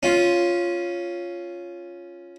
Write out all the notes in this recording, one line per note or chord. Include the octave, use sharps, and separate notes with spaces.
C#4 F4